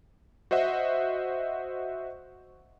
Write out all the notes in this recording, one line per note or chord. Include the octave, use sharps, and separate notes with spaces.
F#4 C5 D#5 E5 F#5